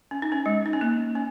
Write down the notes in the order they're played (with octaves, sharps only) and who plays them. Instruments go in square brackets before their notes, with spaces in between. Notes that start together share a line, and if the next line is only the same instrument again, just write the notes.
[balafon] C#4
D#4
C#4
G#3
D#4
C#4
A#3
C#4